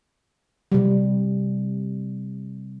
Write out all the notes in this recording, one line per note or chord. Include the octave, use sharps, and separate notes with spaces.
C3 G3